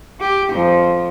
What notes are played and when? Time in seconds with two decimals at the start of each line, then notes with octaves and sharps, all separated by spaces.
0.20 G4
0.52 F2 F3